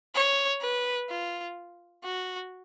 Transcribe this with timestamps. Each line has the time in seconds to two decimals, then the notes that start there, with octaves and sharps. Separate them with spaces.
0.15 C#5
0.61 B4
1.10 F4
2.04 F#4